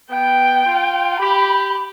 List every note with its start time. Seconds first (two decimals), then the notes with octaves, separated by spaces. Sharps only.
0.10 B3 G5
0.65 F4
1.20 G4 B5